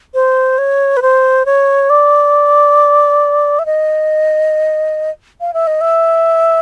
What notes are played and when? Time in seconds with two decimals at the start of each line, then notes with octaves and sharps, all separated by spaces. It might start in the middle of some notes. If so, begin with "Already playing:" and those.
0.14 C5
0.58 C#5
0.97 B4
1.02 C5
1.46 C#5
1.90 D5
3.59 E5
3.66 D#5
5.41 F5
5.54 E5
5.67 D#5
5.81 E5